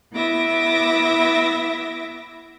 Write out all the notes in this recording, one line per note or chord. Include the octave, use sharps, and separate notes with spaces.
B3 E4 E5 D6 A#6